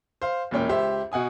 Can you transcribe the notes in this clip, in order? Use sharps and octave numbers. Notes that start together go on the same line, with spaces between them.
C5 F5
E1 A#2 C#4 G5
C#2 G4 C5 E5
B2 F#5 G#5 D#6